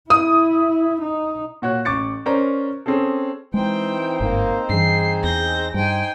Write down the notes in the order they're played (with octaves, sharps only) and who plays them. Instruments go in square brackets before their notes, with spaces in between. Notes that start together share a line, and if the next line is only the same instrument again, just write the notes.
[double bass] E4 [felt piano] D#6
[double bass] D#4
[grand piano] A#2 F#4 C#5 F#6
A1 C#6 D6 A6 C#7
C#4 A#4 C5 D5 A#5
C4 C#4 G#4 A4
[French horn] E3 [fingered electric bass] G#3 [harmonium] C4 D#4 C5 [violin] G5
[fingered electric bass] G1 G#2 [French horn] A#3
[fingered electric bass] G2 E3 [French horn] G#4 [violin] C7
[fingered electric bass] E2 [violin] G6 A#6
[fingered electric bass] G2 [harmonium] D#4 C5 [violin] G5 G#5